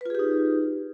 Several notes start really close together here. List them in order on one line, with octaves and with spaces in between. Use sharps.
B4 F4 G#4 G4 D#4